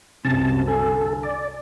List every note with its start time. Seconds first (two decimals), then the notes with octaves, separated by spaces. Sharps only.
0.25 C2 F#2 C3 C#4 A5
0.67 D3 A4 G#5
1.23 D5